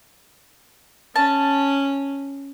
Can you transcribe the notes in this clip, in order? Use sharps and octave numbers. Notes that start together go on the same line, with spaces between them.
C#4 A5